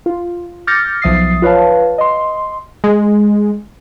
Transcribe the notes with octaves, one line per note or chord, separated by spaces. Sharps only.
F4
D6 F6 G6 A6 A#6 C#7
B1 F3 E5 D#6 A6 C7
F4 B4 C#5 F5 A5
D#5 C6
G#3